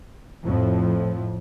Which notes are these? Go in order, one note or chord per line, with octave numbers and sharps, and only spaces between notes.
F2 A2 F3